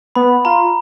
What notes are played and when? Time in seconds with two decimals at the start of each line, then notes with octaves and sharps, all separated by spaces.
0.15 B3 B5
0.45 F4 A#5